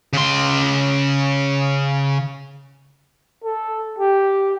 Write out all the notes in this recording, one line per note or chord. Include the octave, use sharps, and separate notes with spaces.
C#3 C6
A4
G4